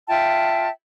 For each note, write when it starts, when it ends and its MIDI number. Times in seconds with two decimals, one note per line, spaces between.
0.08 0.68 65
0.08 0.68 76
0.08 0.68 79
0.08 0.68 81